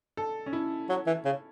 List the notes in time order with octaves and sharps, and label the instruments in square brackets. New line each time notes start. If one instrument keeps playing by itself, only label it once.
[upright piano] A4
C#4
E4
[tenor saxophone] F#3
E3
C#3